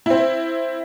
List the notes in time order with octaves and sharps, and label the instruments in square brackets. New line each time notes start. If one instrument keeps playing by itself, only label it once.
[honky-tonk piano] C4 E4